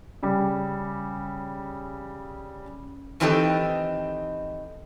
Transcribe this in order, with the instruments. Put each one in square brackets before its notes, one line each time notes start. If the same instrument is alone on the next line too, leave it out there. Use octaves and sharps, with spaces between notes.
[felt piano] C#3 G3
[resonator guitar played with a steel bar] D#3 E3 C4 D#4 G4 A4